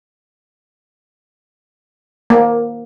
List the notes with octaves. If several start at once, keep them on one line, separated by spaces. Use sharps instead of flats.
A#3